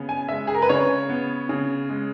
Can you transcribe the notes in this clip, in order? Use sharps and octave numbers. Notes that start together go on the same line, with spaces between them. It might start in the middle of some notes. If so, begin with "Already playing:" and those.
Already playing: C#3 B3
G#5
G#3 E5
G#4
A#4
B4
C#3 C#5
B3
C#3
G#3